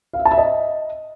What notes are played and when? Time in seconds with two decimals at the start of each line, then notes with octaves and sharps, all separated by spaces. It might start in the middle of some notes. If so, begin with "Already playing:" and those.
0.13 F5
0.19 E5
0.25 A5
0.31 E5
0.37 D#5